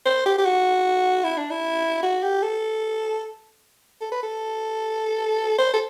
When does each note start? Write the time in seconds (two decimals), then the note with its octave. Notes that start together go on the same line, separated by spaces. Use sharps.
0.06 C5
0.26 G4
0.38 G4
0.45 F#4
1.24 E4
1.37 D4
1.50 E4
2.03 F#4
2.23 G4
2.42 A4
4.01 A4
4.12 B4
4.23 A4
5.58 C5
5.74 A4